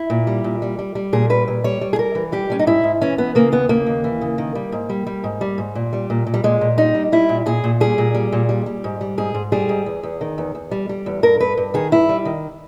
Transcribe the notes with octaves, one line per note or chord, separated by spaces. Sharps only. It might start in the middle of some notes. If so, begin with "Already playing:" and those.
Already playing: E4
A#2
G3
A#2
G3
G3
G3
A#2 G#4
G3 B4
A#2
G3 C#5
G3
G#4
G3 A#4
E3
G3 G4
G3 C#4
D#4
G#2 E4
G#2
E3 C#4
E3 B3
C#3 A#3
D#2 B3
C#3 A#3
D#2
E3
C#3
D#3
G3
G#2
G3
G3
G#2
G3
G#2
A#2
G3
A#2
A#2
G3
A#2 G#3
A#2
G3 D#4
G3
G3 E4
A#2
A#2 G#4
A#2
G3 G#4
A#2
G3
A#2
G3
G3
G#2
G3
G#2 G#4
G#2
G3 G#4
G#2
E2
E2
D#3
E2
E2
G3
G3
E2
G2 A#4
G2 B4
G2
D#3 G#4
G2 E4
G3
D#3